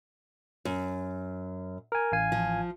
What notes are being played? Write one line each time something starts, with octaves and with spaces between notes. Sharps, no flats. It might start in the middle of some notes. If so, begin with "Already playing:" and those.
F#2
A#4 G#5
A1 F5 G#5
F3